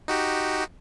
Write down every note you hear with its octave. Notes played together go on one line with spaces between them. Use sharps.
D#4 F#4 G4